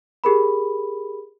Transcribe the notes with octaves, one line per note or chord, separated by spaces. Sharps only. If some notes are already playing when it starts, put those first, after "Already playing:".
G4 G#4 A#4 B5